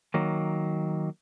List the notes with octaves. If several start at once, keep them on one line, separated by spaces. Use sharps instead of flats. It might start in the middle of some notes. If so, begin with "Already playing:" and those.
D#3 F#3 A#3